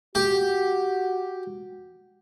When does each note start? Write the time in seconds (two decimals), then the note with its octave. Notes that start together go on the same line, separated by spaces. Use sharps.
0.15 F#4 G4